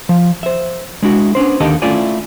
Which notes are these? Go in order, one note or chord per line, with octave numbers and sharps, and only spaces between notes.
F3
C5 E5
G#3 D4 E4 F#4
B3 C#4 D4 C5
D#2 D3 D#3 G4 D#5 A5
A3 C#4 E4 F4 D5 G#5